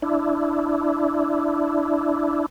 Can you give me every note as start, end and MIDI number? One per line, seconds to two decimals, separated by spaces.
0.02 2.46 62
0.02 2.46 64